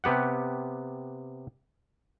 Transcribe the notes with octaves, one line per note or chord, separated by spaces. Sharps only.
C3 B3 G4 F#5